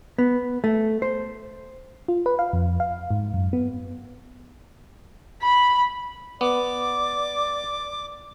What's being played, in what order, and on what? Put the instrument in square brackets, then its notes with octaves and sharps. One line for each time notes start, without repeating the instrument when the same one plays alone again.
[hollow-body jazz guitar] B3
A3
C5
[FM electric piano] F4
B4
F5
F2
F5
G#2
F#2
B3
[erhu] B5
[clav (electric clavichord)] B3 [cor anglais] D5 [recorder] D6